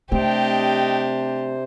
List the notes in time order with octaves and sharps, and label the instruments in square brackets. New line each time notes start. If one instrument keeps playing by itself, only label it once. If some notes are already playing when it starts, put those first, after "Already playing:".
[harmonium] C3 C5 [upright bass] A3 C4 [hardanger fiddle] D4 G4 [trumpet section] D#5 G5